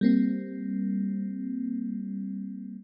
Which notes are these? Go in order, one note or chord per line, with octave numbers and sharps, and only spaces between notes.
G3 A#3 C4